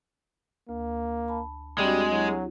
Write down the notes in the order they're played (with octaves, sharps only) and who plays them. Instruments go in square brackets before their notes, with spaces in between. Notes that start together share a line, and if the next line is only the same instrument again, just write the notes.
[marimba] D2 [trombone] A#3
[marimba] A5 B5
[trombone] G3 [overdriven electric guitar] G#3 [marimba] C4 D4 F#4
[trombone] F#3 [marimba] E4 G4